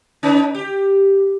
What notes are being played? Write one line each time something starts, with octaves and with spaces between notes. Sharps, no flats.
C#4 D#4 B4
G4